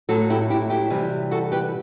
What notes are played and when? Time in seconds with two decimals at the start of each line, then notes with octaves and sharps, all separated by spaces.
0.09 A2 F#3 F#4 A4
0.30 E4 G4
0.50 E4 G4
0.70 E4 G4
0.90 C3 E3 G3
1.31 F#4 A4
1.52 G4 B4